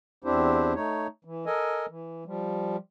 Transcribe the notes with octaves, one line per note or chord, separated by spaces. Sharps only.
E2 C4 D4 E4 G4 C5
A3 D#4 C#5
E3
A4 A#4 D#5 G#5
E3
F3 G3